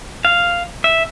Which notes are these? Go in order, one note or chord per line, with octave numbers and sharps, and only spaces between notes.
F5
E5